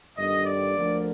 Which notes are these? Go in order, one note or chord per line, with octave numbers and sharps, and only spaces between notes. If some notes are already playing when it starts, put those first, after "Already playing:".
G1 G2 D#3 D#5
D5
D2 D3 F3 A#3